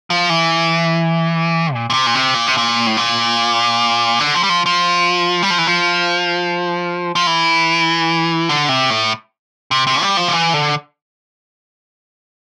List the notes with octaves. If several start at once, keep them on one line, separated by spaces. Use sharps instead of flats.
F3
E3
A#2
A#2
C3
A#2
C3
A#2
C3
A#2
A2
A#2
D3
F3
G3
F3
F3
G3
F3
E3
F3
F3
E3
D3
C3
A2
C3
C3
G3
F3
D3
E3
D3